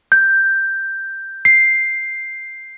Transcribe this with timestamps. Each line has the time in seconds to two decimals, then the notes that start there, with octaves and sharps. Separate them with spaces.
0.12 G6
1.45 C7